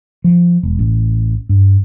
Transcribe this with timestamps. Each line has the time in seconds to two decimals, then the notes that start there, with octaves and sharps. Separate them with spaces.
0.24 F3
0.63 E1
0.79 A1
1.49 G2